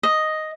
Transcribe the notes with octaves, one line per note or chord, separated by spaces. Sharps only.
D#5